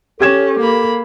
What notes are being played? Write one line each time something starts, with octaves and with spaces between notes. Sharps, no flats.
C#4 G4 A4 G#6 E7
A#3 B5